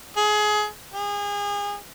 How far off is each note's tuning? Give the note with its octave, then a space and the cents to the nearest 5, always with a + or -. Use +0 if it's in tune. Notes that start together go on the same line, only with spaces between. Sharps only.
G#4 +25
G#4 -30